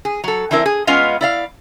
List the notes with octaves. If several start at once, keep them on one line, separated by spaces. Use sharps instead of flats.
G#4
F#3 A4
E3 C4 D4 E4 A#4
G#4
G#3 B3 C#4 F4 D#5 F5
E4 D5 F5